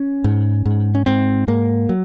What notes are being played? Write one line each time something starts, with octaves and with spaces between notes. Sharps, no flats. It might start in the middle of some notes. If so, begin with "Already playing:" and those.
Already playing: C#4
G#2
G#2
C#4
G#2 C4
G#2 A#3
F#3